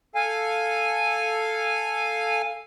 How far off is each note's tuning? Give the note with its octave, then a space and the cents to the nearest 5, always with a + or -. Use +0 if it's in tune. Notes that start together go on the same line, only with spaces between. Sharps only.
A4 +0 F5 +0 G#5 -10